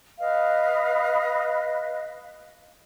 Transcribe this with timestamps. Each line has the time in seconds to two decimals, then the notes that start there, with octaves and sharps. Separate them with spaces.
0.19 B4 D#5 F5